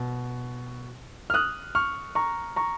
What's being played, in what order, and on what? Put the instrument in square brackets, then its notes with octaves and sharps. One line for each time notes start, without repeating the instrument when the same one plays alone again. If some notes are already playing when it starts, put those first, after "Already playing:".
Already playing: [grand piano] B2
F6
D#6 F#6
C#6 F6
A#5 C#6
A#5 C#6